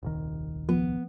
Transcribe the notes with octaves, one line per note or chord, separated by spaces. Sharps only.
D#1 C2 D#3
F3 B3